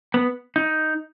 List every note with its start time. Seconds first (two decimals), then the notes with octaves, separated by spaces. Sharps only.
0.14 B3
0.56 D#4